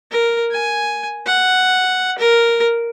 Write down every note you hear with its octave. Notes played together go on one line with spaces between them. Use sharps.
A#4
G#5
F#5
A#4